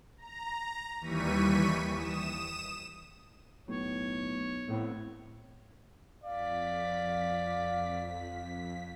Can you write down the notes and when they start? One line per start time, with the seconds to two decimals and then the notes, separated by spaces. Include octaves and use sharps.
0.18 A#5
1.01 D#2 E3 G3 C#6 B6 D#7
1.93 D#6 E7
3.68 B1 A2 C#5
4.68 A2 A3 B3 C4
6.24 F2 D5 F5 B6